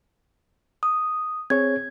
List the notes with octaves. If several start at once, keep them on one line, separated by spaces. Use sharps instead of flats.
D#6
C4 G#4 C#5 G#6